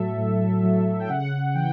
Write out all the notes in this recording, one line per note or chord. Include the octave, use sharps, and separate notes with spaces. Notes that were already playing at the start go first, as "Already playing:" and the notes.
Already playing: A2 F#3 A4 E5
A2
F#3
G5
C#3 F#5
E3 G5